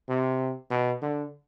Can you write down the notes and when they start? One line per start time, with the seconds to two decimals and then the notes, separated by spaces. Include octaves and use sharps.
0.09 C3
0.71 B2
1.02 D3